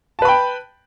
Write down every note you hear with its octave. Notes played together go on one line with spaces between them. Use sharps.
B4 G5 A5 B5